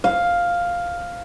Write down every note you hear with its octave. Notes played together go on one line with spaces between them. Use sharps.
F5